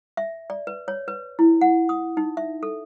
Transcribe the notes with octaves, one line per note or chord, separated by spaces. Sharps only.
E5
D5
B4
C#5
B4
E4
F#5
D#6
D#4
E5
A4